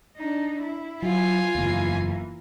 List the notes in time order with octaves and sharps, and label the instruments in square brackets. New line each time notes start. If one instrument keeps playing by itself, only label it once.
[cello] D4 D#4
E4
[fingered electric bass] F#3 [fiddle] F4 G#5
[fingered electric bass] F#1 E2 [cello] E3 A#3